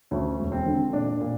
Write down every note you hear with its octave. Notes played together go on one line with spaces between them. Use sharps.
D2 C#4
E1
C4
D3
A#2 D4
A#2